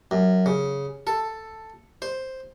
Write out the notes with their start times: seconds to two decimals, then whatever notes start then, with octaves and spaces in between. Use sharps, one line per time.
0.11 F#2
0.46 C#3
1.07 A4
2.02 C5